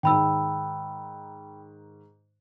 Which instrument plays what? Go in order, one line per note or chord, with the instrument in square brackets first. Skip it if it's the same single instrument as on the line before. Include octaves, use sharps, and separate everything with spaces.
[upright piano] G#2 D#3 [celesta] G5 B5 E6